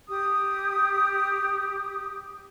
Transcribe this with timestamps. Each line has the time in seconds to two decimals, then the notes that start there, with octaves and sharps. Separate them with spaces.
0.08 G4 D#6